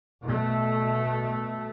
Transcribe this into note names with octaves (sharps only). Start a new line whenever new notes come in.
B2 A3